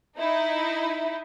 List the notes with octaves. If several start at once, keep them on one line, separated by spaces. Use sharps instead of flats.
D#4 E4